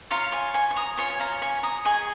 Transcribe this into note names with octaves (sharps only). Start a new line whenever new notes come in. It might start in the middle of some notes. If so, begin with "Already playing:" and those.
F4 C#5 F5 A#5
G#5 C#6
G#5 C#6
C#6
A#5 D#6
F4 C#5 G#5 C#6
G#5
F5 A#5
G#5 C#6
A#5 D#6
G#4 D#5 G#5 C#6